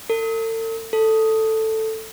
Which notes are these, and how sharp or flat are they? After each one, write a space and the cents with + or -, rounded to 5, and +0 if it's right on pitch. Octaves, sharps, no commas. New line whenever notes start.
A4 +40
A4 +5